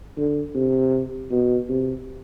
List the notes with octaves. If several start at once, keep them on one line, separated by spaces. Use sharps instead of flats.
D3
C3
B2
C3